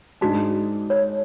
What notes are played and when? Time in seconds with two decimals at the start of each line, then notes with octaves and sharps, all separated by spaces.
0.21 G#2 G#3 D4 F#4
0.90 C#5